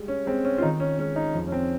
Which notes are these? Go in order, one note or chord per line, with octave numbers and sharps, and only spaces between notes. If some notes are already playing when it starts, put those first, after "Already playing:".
Already playing: G3 G#3
C#4
G#3 C4
C#4
F4
D#3 D#4
C#4
G#3 C#4
D#4
F2
C#4
C4